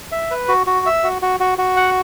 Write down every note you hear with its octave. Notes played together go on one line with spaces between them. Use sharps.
E5
B4
F#4
F#4
E5
F#4
F#4
F#4
F#4
F#5